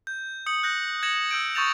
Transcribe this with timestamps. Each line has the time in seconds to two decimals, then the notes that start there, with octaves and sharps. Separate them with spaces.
0.07 G6
0.46 D#6 G6 C#7 F#7
0.63 F#6 G6 A#6
1.03 G#6 A#6 C#7 E7 F#7
1.31 E6 G6 D7
1.55 C#6 D#6 G6 A6 E7 F7